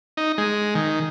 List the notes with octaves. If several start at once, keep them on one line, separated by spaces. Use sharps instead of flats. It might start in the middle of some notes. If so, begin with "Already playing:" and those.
D#4
G#3
D#3